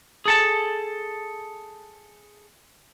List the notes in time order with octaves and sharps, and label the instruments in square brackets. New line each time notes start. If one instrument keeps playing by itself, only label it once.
[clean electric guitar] G#4 A4 A5